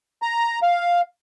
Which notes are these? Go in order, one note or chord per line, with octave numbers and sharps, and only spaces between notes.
A#5
F5